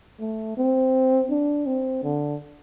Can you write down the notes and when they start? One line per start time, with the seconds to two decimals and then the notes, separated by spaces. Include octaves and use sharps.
0.20 A3
0.57 C4
1.31 D4
1.66 C4
2.04 D3